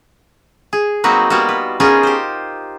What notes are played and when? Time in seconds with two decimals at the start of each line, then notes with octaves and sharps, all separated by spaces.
0.73 G#4
1.04 F#3 A#3 C4 D#4 F#4 B4
1.30 G3 A#3 B3 F4 F#4
1.49 B4
1.80 B3 C#4 D#4 F4 G#4 A#4
2.03 G4 C5